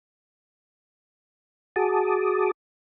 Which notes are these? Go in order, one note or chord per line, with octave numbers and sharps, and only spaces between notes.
F#4 G#4 A5 D6 D#6